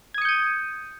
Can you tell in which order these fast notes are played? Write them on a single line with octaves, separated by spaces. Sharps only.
G#6 D#6 C#7 G6 D#7